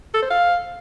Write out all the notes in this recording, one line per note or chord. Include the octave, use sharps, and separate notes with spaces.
A4
C5
F5